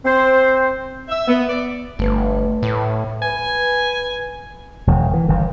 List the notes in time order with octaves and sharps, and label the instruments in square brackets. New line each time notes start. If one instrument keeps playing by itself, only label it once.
[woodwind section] C4 C5
[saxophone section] E5
B3
D5
[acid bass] G1 [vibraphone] A3 B4
[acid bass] A2
[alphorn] B4 [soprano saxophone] G#5
[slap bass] E1 D#3 G#3
E3
G1 D#3 E3